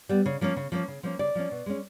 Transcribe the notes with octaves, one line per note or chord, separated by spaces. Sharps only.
G3 B3
C#3
F3 A#3 C#4
C#3
F3 A#3 C#4
C#3
F3 A#3 C#4
C#3 D5
F3 A#3 C#4
B2
G#3 C#4